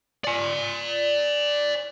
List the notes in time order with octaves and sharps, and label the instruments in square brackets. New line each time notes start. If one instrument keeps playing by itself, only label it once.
[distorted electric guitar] D5 G#5